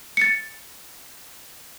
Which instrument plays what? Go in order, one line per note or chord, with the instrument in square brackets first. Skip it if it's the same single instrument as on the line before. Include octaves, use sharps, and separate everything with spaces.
[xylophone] A6 C#7